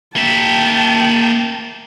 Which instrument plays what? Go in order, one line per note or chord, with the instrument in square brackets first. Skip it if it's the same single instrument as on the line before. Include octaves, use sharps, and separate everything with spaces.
[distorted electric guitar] A#3 E5 [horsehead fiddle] G5 A5